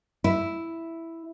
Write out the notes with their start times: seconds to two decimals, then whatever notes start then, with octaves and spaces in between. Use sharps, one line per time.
0.24 E4